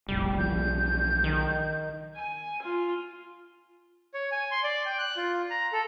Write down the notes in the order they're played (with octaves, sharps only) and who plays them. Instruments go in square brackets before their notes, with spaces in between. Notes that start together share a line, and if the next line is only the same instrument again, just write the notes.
[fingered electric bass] F1 A#1 [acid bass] G3
[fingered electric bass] B1 E3 F3 [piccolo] G6
[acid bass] D#3
[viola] G#5
F4
[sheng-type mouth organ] C#5
G#5
C6
D5
G5
F#6
F4
A#5
A4